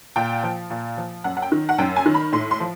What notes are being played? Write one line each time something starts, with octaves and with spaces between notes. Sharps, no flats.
A#2 G5
F3
A#2
F3
F#2 F#5
F#5
G5
D#3
F#5
F#2 G5
G#5
D#3
B5
A2 C6
C6
F3